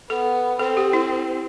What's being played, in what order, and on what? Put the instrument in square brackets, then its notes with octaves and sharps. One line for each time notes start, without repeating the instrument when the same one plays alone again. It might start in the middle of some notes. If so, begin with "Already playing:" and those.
[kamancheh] B3 [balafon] A4
[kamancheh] C4 [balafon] A4
[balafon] G4
E4